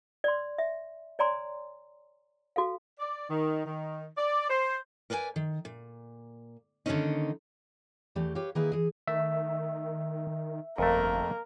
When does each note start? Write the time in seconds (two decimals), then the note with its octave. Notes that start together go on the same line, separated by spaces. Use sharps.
0.24 D5 C6
0.58 E5
1.19 C#5 D5 G#5 A#5 C6
2.56 F#4 A4 F5
2.99 D5
3.29 D#3
3.66 D#3
4.17 D5
4.49 C5
5.10 A#4 B4 D5 D#5 G#5
5.36 D#3
5.65 A#2
6.86 D3 D#3 G#3 A#3 C#4 D#4
8.15 E2 E3 A3 G4
8.35 G4 B4 C#5 F5
8.55 D#3 A#3 E4 G#4 B4
8.72 E3 G#4
9.08 D#3 A3 E5
10.78 G1 F2 A3 A#3 A#4